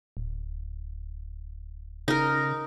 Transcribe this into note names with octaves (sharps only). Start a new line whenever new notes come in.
D1
C#3 D#4 A#4